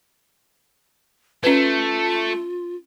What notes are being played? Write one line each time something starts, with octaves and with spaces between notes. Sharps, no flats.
A3 C#4 F4 B4